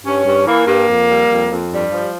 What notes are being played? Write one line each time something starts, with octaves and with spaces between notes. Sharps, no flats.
G2 C#4
G2
E3 A#3
G2 A#3
F2
G3
F2
F2
G2 G3
F3